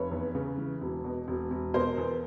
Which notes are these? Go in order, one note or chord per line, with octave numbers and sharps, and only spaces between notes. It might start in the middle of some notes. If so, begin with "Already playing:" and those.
Already playing: F1 B4 C#5
E2
C#3
E3
E1
B2
E1
E1
B2 A#4 C5
E2